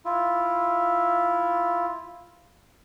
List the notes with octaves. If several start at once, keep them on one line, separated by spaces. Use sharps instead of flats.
E4 F4